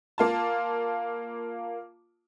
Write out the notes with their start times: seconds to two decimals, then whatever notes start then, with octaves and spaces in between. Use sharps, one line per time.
0.18 A#3 F4 A5